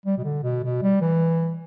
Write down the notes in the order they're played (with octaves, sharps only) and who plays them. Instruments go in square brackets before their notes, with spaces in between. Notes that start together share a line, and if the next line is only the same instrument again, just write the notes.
[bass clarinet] G3
B2
D3
B2
B2
G3
E3